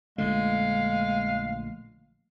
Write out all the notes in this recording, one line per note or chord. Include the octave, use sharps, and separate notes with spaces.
A#1 D3 G#3 A3 F5